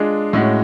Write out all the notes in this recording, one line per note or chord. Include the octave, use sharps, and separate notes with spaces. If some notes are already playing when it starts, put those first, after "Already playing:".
Already playing: G#3 D4 F4 G#4
A2 G#3 C#4 F#4